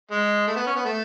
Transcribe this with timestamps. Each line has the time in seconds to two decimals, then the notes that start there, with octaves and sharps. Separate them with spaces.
0.11 G#3
0.47 A3
0.56 B3
0.67 C#4
0.76 B3
0.85 A3